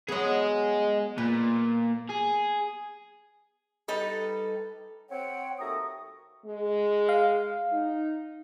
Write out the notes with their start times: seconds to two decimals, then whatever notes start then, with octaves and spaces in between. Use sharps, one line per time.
0.08 F#3 B3 G#4 D#5
1.18 A#2 B4
2.09 G#4
3.88 G3 D#4 A4 B4
5.11 C4 C#5 F#5 G5
5.60 D#2 A3 F#4 E5 A#5 D#6
6.46 G#3
7.09 F5
7.72 D#4